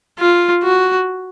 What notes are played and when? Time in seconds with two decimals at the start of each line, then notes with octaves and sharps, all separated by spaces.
0.19 F4
0.63 F#4